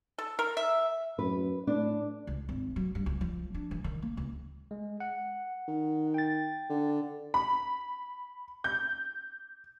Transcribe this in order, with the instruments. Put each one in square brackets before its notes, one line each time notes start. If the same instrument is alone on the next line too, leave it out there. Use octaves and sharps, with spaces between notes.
[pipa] A4
A#4
E5
[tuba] F#2 [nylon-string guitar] B4
[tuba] A2 [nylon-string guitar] D4
[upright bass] C#2
G#1
F#3
G2
C#2
F3
D4
E3
D#3
A#3
C#2
[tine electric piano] G#3
F#5
[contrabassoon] D#3
[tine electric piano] G5 A6
[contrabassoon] D3
[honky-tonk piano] B5
G6